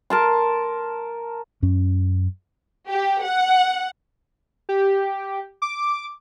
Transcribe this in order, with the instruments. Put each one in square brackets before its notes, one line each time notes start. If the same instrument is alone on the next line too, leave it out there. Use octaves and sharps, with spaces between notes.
[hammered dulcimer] A#4 A5 C6
[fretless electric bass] F#2 C#4
[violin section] G4
F#5
[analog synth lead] G4
D6